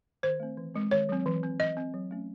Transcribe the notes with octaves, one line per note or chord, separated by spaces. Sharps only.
D#3 C5
A3 C4
E3
G#3 C4
D#3 C#5
F#3 C4
E3
C4
E3 D#5
C4
F#3
A3 C#4